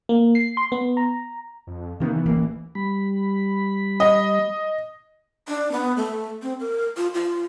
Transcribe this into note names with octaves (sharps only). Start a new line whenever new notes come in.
A#3
C7
C6
B3
A#5
F2
C3 D#3 A#3 B3
E3
D1 A1 A#3
G3 B5
D#5
D4
B3
A3
C4
A#4
F4
F4